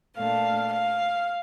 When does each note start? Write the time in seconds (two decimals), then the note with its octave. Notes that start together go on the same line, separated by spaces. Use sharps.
0.16 A#2 A3 D4 F5
0.73 F5